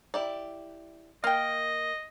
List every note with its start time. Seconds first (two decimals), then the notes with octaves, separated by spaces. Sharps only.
0.14 E4 G4 D5
1.24 A#3 D#5 F5 G5